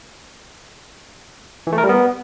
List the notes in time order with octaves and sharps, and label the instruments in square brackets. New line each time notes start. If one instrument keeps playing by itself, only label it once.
[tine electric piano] E3
A3
A#4
G3
B3